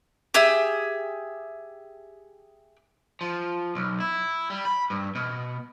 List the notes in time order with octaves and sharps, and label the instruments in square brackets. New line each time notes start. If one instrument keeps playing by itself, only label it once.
[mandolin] G4 G#4 E5
[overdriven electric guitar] F3
B1
E4
G3
B5
G2
B2